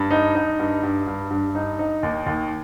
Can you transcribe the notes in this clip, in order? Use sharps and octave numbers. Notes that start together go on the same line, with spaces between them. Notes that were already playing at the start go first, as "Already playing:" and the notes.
Already playing: G2
D#4
D#4
G2
G2
G2
G2
D#4
D#4
D#2
D#2